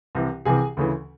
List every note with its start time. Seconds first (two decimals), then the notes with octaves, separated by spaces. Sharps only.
0.15 C2 C3 E3
0.45 C2 C3 E3 G#4 G#5
0.77 D2 C#3 E3